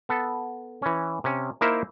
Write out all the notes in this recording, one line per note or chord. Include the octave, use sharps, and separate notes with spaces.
B3 A4
E3 C#4
C3 C#4
A#3 D#4 E4 A#4 C5 E5